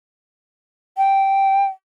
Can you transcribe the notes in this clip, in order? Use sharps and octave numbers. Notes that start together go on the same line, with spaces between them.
G5